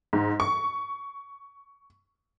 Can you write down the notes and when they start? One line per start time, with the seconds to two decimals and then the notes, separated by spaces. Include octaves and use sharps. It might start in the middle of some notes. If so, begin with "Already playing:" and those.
0.13 G#2
0.40 C#6